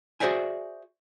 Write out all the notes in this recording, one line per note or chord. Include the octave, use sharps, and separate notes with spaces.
F#4 G#4 C5 D5 E5 G#5